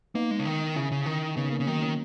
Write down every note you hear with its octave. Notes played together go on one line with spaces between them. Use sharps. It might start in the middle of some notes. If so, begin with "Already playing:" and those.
A#3 B3 D#4
G#3
C#3
D#3
C#3 C#4 E4
C#3
D#3
C#3 B3 D#4
A#3 C#4
C#3
D#3 F#3 A#3
A#3 C#4